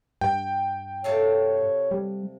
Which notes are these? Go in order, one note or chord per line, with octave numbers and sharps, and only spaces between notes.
G2 G5
C3 A4 C#5 F5
G3